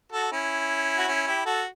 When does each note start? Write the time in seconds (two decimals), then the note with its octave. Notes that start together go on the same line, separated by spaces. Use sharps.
0.12 F#4 A4
0.32 C#4 E4
0.98 F#4
1.08 C#4 E4
1.27 E4 G4
1.45 F#4 A4